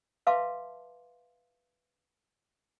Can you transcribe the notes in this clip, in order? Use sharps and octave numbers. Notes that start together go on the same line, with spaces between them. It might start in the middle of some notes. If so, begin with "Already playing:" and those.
B4 E5 F5 A5 C6 D6